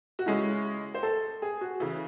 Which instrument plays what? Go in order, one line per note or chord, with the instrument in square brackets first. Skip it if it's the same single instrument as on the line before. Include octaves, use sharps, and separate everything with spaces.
[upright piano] F#4
[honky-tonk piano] C#3 G#3 C#4 [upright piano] E4
[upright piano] C5
A4
G#4
F#4
[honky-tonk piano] C#3 E3 [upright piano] E4